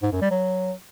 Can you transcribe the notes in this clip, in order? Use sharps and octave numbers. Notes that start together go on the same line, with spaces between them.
G#2
F#2
G3
F#3